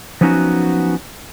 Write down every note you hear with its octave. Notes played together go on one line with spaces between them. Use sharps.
F3 F#3 B3 C#4 D#4 F#4